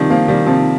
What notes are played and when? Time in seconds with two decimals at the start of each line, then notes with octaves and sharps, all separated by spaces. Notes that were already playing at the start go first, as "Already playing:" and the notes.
Already playing: C3 D#3 F3 G3
0.10 F3 A#3
0.28 D#3 G3
0.46 C3 F3